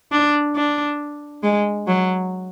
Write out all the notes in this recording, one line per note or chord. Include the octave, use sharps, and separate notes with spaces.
D4
D4
G#3
F#3